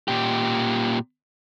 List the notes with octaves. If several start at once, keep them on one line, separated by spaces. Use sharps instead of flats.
A#2 G4